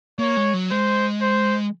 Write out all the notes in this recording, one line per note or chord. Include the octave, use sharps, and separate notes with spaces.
A#3 C#5
G#3
F#3
G#3 C5
C5